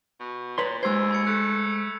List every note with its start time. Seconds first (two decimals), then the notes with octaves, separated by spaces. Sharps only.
0.20 B2
0.58 A#2 B4 C#5 C6
0.83 D#2 G#3 C5 E6 G#6
1.11 B5 G#6 C#7
1.27 A3 F#6